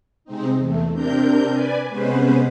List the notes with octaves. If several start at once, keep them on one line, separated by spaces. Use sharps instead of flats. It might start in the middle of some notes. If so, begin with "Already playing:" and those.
C3 G#3 C4 D#4
E2 A3
C3 C4 D4 A#4 G6
B4 D5 G#5
C3 G#3 B3 C#4 B4 C5